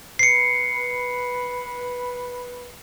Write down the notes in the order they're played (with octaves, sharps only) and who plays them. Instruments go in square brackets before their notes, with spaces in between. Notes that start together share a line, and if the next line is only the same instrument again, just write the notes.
[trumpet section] B4 [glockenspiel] C7 C#7